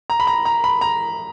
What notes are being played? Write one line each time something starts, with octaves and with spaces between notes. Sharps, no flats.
A#5
B5
A#5
A#5
B5
A#5